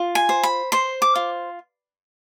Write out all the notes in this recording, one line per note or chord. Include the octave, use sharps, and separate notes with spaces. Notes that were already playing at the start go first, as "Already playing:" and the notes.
Already playing: F4
G#5
C5
B5
C5 C6
D6
F4